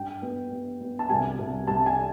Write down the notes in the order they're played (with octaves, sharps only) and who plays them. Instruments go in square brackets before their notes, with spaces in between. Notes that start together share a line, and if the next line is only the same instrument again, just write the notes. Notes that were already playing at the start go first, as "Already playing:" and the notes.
Already playing: [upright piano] G2 G5
B3
B3
B3
A5
C2 G#5
C2
C2 A5
G#5